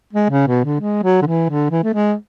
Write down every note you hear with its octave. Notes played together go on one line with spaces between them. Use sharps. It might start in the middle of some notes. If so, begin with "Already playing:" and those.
G#3
C#3
B2
D3
G#3
F#3
D3
E3
D3
E3
A3
G#3